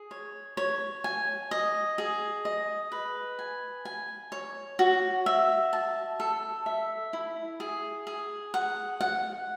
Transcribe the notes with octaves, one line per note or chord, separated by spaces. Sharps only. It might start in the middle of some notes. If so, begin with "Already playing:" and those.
Already playing: G#4
C#5
C#5
G#5
D#5
G#4
D#5
B4
G#5
G#5
C#5
F#4
E5
A5
A4
E5
E4
G#4
G#4
F#5
F#5